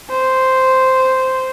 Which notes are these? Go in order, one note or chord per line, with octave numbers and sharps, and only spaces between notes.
C5